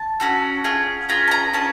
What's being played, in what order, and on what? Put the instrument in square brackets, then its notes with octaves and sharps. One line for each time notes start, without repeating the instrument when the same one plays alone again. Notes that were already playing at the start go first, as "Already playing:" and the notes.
Already playing: [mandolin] A5
C#4 F#4 A4
C#4 F4 G#4
C#4 F4 G#4 A#5
A5
A#5
C#4 F4 G#4 A5